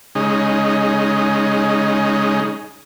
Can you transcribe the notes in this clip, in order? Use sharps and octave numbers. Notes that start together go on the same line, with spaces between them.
C#3 G#3 D#4